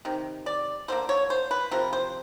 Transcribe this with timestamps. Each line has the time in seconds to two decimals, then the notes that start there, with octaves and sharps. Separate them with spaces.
0.05 C3 D#3
0.46 D5
0.88 D3 G3 A#3 C5
1.09 C#5
1.30 C5
1.51 B4
1.71 C3 F3 A#4
1.93 C5